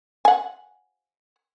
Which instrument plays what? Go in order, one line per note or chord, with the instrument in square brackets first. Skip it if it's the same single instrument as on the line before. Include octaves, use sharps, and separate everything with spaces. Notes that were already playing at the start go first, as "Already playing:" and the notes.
[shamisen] F#5 G#5